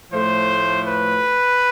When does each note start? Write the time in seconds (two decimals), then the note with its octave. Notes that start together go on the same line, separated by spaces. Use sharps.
0.11 A2 F3 A3 C5
0.88 B4